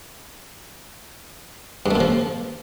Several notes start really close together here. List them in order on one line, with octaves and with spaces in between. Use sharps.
G2 A3 A#2 F3